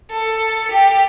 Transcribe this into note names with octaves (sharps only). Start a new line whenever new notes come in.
A4
G4